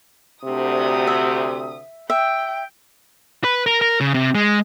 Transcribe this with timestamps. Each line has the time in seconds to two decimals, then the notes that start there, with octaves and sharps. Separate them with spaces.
0.45 D2 C3 D#6
1.07 E5
2.10 E5 G5
3.44 B4
3.66 A#4
3.82 A#4
4.00 C#3
4.14 C3
4.35 G#3